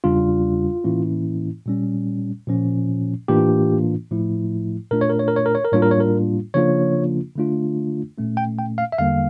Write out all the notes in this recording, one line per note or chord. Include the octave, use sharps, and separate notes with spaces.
E2 C#3 G3 D4 F4
A2 E3 A#3 C#4 E4
A#2 G3 C#4
A#2 F3 C#4
A2 E3 A#3 D4 F4 G4
A2 F3 A3 E4
A#2 A3 D4 F4 A#4
C#5
A#4
C#5
A#4
C#5
A#4
C#5
A#4
A2 G3 A#3 D4 F4 C#5
A#4
C#5
A#4
C#3 F3 A#3 D4 F4 C#5
D3 A3 D4 F4
A#2 A3 C#4
G5
G5
F5
E5
E2 D3 G3 A#3 F5